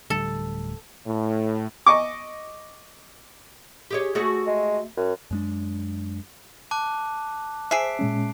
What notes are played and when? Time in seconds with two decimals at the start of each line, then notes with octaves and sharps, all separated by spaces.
0.10 D1 D2 G3 A4
1.06 A2
1.86 D#5 C#6 D6
3.91 G4 G#4 C#5
4.15 A3 F#4 G#4
4.47 G#3
4.97 F#2
5.31 F#2 G#3 D4
6.71 A5 D6 F#6
7.71 G#4 C5 E5 C7 D7
7.99 A#2 G#3 C#4